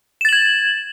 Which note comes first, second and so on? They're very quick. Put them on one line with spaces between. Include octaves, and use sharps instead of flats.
E7 A6 F#7 G#6